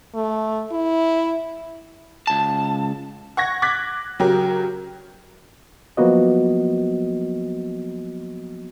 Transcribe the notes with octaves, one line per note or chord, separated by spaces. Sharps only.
A3
E4
C#2 A5
F#5 C#6 G#6 A#6
D6 F#6 G#6 A6 B6
C#3 F#3 G4 A#4
F3 F#3 A#3 B3 F#4 D#5